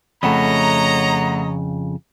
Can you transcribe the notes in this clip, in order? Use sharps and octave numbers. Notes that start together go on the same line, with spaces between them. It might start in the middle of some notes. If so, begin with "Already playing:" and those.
F2 C#3 A3 C#5 D#5 F#5 A#5 B5